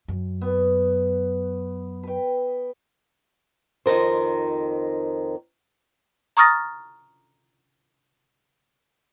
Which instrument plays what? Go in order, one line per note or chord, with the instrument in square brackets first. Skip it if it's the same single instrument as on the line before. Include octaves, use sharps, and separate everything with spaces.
[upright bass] F#2
[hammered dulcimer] B3
B4 G5
[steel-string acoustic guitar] F2 D#3 A4 A#4 C5
[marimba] A#5 C#6 D#6 F6 A6 A#6